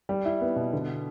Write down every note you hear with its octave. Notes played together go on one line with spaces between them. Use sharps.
G3
E4
B3
B2
D3